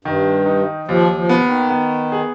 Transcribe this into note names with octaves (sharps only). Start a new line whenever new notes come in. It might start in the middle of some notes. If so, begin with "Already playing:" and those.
G2 D#3
D#4
D#2 F3
F3
B3
D#3
B3
G#4